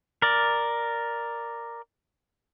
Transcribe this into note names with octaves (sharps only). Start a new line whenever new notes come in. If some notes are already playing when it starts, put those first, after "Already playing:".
A#4 D5